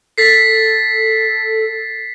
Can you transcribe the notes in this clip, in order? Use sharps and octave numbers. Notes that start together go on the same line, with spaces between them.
A4 A6 B6 C7